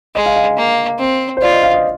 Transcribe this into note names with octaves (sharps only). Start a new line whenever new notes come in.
G#3 D#5
F5
F5
A#3
C4
C5
F4 D5
D#5
F5
D#5